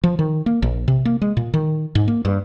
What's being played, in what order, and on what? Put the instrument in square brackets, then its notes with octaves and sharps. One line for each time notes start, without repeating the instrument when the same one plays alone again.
[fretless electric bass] F3
D#3
A#3
A#1
C3
A#3
G#3
A#2
D#3
G#2
A#3
G2